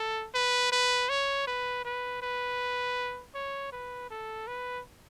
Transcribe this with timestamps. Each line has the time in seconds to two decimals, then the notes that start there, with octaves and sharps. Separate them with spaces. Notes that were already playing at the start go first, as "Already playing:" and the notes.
Already playing: A4
0.35 B4
0.72 B4
1.09 C#5
1.47 B4
1.85 B4
2.22 B4
3.35 C#5
3.72 B4
4.10 A4
4.47 B4